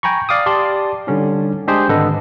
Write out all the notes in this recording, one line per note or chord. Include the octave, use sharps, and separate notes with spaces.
G5 G#5 A#5 B5 C#6
D5 F5 D6 D#6
G4 D5 A5 C6
D3 G3 C#4 D#4
G#3 D4 G4 G#4 C5
G#1 D3 A4 B4 D#5